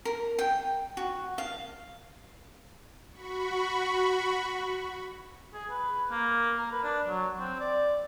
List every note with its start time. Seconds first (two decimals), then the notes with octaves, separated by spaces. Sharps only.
0.05 A#4
0.39 G5
0.97 F#4
1.38 F5
3.12 F#4 B5 C#6
5.54 G#4
5.70 B4
6.11 A#3
6.57 A#4
6.72 B4
6.83 D4
7.08 F#3
7.39 C4
7.60 D5